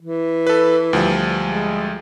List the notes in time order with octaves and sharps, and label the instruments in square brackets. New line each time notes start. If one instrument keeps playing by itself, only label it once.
[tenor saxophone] E3
[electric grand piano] A4 B4
D2 F3 G3
[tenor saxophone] G#3